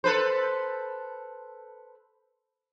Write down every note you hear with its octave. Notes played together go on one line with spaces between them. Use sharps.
A4 B4 C5